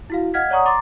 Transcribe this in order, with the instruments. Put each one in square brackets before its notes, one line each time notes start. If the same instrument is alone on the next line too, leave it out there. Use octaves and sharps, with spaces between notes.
[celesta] E4 F#4 F5
D#5 F5 F#5 F6 G#6 B6
C#5 D5 F#5 A#5 C#6 D#6
A#5 C6 D6 A6